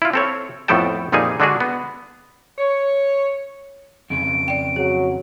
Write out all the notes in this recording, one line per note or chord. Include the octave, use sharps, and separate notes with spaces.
E4 F4
C4 A4 C#5
F2 A2 B3 A4 G5 A5
F2 A#2 G3 D#4 G#4 G#5
D3 G#3 D4 F#4 G#4
B3
C#5
F2 C#3 D7
D5 G5
F#3 G#4